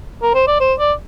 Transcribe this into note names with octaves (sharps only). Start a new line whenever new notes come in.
A#4
C5
D5
C5
D5